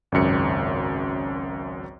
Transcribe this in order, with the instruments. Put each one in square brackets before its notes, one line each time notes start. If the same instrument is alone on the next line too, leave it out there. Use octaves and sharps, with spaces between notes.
[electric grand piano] G#1 C#2 F#2 C#7